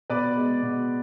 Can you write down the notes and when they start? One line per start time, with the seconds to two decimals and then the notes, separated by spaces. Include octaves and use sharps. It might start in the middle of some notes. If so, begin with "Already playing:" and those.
0.10 B2 B4 D5
0.37 G#3 B3
0.63 B2